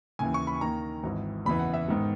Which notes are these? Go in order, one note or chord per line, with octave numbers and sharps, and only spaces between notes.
D#2 C#3 E3 G#5
C#6
B5
D#2 D#3 A#3 A#5
G#1 G#2 E3
F#1 E2 C#3 E3 B5
F#5
E5
G#2 D#3 G#3 B3